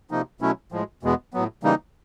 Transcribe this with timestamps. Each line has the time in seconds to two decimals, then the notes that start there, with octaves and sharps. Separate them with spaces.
0.11 C3 F3 A#3 D#4
0.41 B2 F#3 A3 C#4 E4
0.72 A2 F3 G#3
1.03 E2 B2 G#3 B3
1.33 A2 F#3 B3
1.63 C#3 E3 G3 A#3 D#4